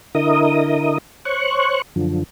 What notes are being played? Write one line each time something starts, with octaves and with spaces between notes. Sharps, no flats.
D3 E4 A#4 D#5 D#6
C5 C#5 C#6 F#6
F#2 D3 F3